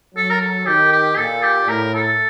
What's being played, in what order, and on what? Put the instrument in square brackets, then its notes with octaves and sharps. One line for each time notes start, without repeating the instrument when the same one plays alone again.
[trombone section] F#3 [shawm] A4
[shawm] A#4
A4
[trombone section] D#3 [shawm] G4
[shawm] G4
[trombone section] A#2 [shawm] A4
[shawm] G4
[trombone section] A2 [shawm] A#4
[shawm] A4